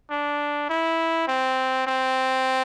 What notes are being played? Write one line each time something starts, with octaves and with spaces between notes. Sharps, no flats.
D4
E4
C4
C4